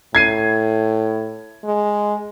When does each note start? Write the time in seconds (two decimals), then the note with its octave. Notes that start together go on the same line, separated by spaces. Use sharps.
0.15 A2 G#6 C7 D#7
1.65 G#3